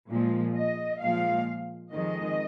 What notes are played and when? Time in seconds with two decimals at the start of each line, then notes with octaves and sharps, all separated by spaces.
0.10 A#2 F3 G#3
0.56 D#5
1.02 A#2 F3 G#3 F5
1.93 F2 D#3 G#3 D#5